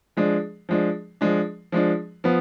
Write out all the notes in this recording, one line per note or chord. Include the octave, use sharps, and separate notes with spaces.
F3 G#3 D4
F3 G#3 D4
F3 G#3 D4
F3 G#3 D4
F3 B3